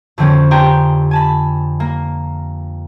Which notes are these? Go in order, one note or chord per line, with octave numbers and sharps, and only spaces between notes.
F2 D3 F3 C4 C#4
D4 G4 G5 G#5 A#5 C6
G#5 A5 B5
A#3